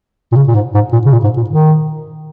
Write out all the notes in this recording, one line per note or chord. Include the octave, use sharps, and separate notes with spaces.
A#2
C#3
A#2
G#2
G#2
A#2
C#3
A#2
G#2
A#2
D#3